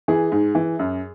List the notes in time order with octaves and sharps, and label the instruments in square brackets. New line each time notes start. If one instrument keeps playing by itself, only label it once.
[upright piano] E3 G#4
G#2
E3
F#2